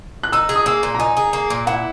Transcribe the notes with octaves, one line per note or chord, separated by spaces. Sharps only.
F#6
D#4 E6
G#4
D#6
A#3 E6
A#2
A#5
D#4 G#5
G#4
A#3
A#2
E4 F#5